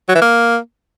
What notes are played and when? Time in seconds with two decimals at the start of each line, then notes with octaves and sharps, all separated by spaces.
0.09 F#3
0.15 E3
0.22 A#3